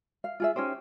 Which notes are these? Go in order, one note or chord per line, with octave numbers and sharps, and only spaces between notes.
F5
F4 G#4 E5
C#4 D#4 G4 C5